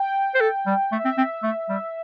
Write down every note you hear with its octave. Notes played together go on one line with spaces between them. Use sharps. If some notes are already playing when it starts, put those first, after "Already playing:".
Already playing: G5
C5
A4
G3
A3 E5
C4
C4
A3
G3